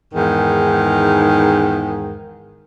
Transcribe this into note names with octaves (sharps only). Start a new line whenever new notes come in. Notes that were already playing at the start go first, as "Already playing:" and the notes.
E2 G#2 D#3